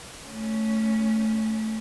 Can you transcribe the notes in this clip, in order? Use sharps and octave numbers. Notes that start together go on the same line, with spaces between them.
A3 C#4